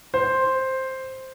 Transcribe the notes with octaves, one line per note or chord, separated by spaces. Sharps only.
C5